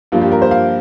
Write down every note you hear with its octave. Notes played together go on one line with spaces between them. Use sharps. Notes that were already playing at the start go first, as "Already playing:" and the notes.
G2 F3 A#3 F4
G4
A#4
C5
F5